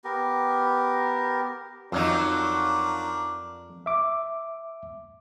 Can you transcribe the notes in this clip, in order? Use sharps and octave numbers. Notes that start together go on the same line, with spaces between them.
B3 G4 A#4
F2 F3 F#3 D4 D#4 A#4 D6
E5 D6